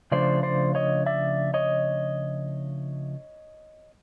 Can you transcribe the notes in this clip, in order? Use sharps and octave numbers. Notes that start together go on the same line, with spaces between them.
C#3 F3 A3 D4 C5 D5
C5 D5
C#5 D#5
D5 E5
C#5 D#5